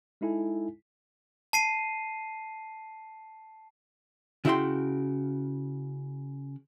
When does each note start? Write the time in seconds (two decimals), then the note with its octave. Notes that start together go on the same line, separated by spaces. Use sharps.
0.21 G#3 D#4 E4 A4 G#5
1.53 A5 C7 D#7
4.45 C#3 E4 F#4 E5 G5 C6